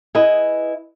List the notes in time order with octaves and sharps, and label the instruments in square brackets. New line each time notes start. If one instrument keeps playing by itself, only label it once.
[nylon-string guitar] E4 G#4 B4 D#5